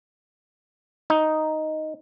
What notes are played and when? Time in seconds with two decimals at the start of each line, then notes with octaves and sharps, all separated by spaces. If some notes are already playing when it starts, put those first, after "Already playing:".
1.10 D#4